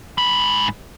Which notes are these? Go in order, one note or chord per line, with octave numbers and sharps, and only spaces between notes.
G#2 B5